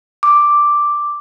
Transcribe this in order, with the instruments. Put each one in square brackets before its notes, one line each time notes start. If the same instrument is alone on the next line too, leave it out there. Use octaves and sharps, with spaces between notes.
[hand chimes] D6